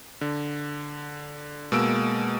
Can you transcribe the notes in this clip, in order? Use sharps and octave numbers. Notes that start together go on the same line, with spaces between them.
D3
B2 G#3 A#3 E6 D7